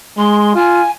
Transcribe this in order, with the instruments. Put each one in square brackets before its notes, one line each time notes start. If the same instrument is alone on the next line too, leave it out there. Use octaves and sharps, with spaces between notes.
[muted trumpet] G#3 [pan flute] C6
[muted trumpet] F4 [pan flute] G#5